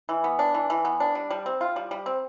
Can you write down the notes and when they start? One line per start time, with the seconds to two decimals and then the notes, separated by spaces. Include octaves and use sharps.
0.09 E3
0.24 B3
0.39 D4
0.54 E3
0.70 E3
0.85 B3
1.00 D4
1.15 G3
1.31 G3
1.46 C4
1.61 F4
1.76 G3
1.91 G3
2.06 C4